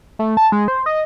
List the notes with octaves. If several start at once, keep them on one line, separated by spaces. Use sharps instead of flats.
A3
A5
G#3
C5
D#5